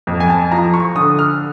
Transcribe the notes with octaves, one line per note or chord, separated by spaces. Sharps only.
F2
G#5
A5
F3 A#5
C#6
D3 D#6
F6